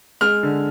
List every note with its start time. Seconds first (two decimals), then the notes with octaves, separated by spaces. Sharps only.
0.21 G#3 F6
0.43 D3